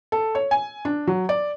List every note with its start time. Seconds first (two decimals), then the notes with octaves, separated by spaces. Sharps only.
0.12 A4
0.35 C#5
0.51 G#5
0.85 D4
1.07 F#3
1.29 D5